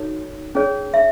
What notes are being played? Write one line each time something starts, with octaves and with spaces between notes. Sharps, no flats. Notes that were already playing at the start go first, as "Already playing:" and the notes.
Already playing: D#4 F#4 A4 C#5
C#4 G#4 C#5
E5